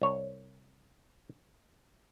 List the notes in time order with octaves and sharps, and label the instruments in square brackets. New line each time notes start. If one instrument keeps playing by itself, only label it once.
[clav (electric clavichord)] C2 C#5